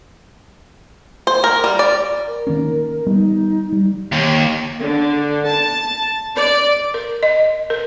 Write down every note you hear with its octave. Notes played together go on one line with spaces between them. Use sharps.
C5
A#4
G3
D5
A#4
D#3 A#3 C#4
G3 B3 D#4
G3
D#2
D3
A5
D5
A#4
D#5
A#4